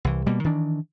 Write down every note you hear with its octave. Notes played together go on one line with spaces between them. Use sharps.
C2 E3
B2 G3 A#3
D#3 E3 D4